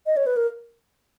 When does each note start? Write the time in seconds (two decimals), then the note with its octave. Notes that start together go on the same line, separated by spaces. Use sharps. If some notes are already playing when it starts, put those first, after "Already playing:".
0.06 D#5
0.17 C#5
0.26 B4
0.36 A#4